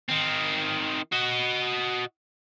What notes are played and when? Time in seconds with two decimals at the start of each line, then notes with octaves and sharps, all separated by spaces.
0.09 D#3 C4
1.12 F#4 D#5